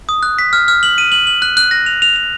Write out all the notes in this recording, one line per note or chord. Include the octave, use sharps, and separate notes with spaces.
D#6
F#6
B6
F6
F6
F#7
D#7
F#7
F#7
F#6
F#6
A#6
F7
F7
F7